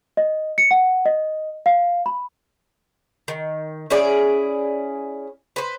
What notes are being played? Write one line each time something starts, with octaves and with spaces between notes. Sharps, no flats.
D#5
C#7
F#5
D#5
F5
B5
D#3
C#4 E4 G#4 D5
B4 C5